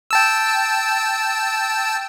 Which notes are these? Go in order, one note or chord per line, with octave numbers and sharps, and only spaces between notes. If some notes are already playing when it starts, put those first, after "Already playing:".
G5 A5 E6